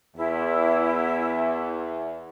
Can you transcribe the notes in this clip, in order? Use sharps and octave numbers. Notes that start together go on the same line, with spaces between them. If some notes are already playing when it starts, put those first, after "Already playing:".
E2 E4